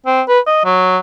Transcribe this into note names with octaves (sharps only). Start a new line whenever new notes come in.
C4
B4
D#5
F#3